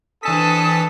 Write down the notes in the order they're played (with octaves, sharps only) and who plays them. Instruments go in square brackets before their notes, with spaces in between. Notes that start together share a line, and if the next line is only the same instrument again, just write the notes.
[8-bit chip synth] E3 A5 B6 [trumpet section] C4 G#4 A4 [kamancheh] D4 D#6